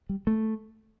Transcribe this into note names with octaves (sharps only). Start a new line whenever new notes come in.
G3
A3